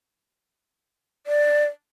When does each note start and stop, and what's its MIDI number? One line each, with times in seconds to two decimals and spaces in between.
1.27 1.66 74